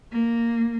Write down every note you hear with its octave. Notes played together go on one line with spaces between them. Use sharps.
A#3